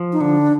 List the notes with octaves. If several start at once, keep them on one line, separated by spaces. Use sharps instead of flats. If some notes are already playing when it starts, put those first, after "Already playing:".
Already playing: F3
D#4
D3 D4